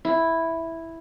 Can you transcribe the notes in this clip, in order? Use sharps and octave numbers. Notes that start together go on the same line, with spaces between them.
E4